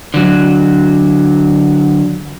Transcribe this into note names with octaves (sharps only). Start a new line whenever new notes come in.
D3 F#3